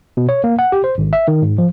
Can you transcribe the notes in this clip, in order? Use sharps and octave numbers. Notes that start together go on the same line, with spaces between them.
B2
C#5
A#3
F#5
G4
C5
G#1
E5
D#3
G#2
F3